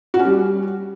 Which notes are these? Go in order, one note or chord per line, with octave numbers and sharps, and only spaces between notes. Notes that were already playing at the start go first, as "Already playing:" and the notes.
F#4
C#4
G3